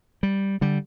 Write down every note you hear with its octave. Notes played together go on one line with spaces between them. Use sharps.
G3
D3 G3